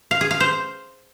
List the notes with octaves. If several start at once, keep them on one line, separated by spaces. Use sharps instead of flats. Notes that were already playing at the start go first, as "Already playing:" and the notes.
F5
G#4
F5
C5